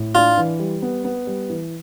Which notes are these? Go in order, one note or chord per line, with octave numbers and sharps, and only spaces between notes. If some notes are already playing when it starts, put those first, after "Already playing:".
Already playing: A2
D4 F4
E3
G3
B3
B3
G3
E3